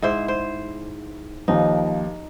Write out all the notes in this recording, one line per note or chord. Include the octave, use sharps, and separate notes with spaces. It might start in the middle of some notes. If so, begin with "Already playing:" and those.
G#2 E4 C5
C5
D#2 F3 D#4